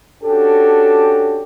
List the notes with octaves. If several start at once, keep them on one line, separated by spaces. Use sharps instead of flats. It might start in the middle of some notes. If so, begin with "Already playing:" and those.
C#4 D4 F#4 G4 A4